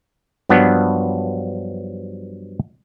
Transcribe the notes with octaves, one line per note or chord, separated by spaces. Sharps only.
G2 F3 F#3 B3 D4